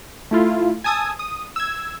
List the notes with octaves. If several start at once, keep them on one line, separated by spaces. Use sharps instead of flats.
A3 E4 F4
G#5 A5 D#6 E6 G#6
D#6
E6 G#6